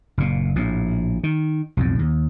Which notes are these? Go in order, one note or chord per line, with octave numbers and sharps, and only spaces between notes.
F#1 A#2
A#1 A2
D#3
B1 F2 A2
D#2